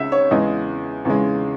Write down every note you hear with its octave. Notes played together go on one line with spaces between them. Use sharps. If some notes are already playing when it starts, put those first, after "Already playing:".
Already playing: C#2 C#3 G#3 E5
C#5
E2 C#3 G#3 D#5
E2 C#3 G#3